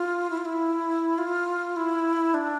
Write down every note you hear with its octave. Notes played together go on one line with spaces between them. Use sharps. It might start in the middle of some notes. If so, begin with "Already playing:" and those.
Already playing: F4
E4
F4
E4
F4
E4
D4